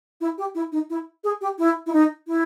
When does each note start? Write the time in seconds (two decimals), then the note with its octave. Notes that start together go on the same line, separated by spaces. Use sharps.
0.21 E4
0.38 G4
0.55 E4
0.72 D#4
0.90 E4
1.24 G#4
1.41 G4
1.59 E4
1.87 E4
1.93 D#4
2.27 E4